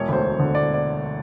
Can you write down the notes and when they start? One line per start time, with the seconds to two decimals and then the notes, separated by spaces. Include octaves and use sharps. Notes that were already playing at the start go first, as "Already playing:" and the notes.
Already playing: E1 C#5
0.08 D2 C5
0.23 E1
0.39 D3
0.55 E1 D5
0.74 D5